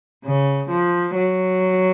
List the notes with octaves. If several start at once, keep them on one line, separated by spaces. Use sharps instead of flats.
C#3
F3
F#3